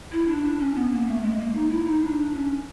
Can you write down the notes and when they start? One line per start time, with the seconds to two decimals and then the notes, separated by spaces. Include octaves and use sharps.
0.12 E4
0.28 D4
0.43 D4
0.60 C#4
0.75 B3
0.91 A#3
1.07 A3
1.22 G#3
1.39 A#3
1.54 D#4
1.70 E4
1.86 D#4
2.02 D4
2.34 C#4